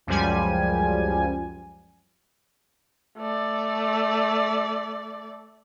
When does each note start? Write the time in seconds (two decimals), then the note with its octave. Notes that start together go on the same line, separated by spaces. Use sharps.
0.07 C#2 F#2 F3 G3 G#5
3.18 A3 D5